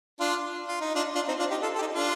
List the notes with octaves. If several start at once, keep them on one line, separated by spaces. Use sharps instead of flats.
D4 F4
F4
D#4
D4 F4
D4 F4
C4 D#4
D4 F4
D#4 G4
F4 A4
A4
D#4 G4
D4 F4